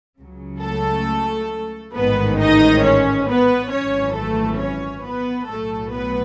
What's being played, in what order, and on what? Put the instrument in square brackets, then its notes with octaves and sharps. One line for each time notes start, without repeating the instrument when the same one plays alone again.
[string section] C#2 C#3 F#3
A3 A4
A1 G#2 D#3 G#3 B3 B4
D#4 D#5
C#4 C#5
B3 B4
G#1 F#2 E3 C#4 C#5
A3 A4
C#4 C#5
B3 B4
B1 A2 F#3 A3 A4
B3 B4